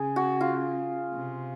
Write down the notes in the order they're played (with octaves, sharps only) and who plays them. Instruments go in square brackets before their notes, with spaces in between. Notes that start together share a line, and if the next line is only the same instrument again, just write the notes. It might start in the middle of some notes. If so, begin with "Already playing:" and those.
Already playing: [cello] C#3 [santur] G#4
[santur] F#4
F4
[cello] C3